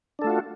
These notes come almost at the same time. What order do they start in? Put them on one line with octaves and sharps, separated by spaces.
D4 A4 A3 F4 F#4